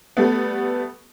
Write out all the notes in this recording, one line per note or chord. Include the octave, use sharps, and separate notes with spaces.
G3 A3 B3